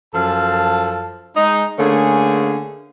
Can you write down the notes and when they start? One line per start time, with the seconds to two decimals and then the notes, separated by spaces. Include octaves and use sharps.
0.14 F#2 F3 A4 F5 A5
1.36 G#3 D#4
1.79 D3 A3 A#3 C#4 G#4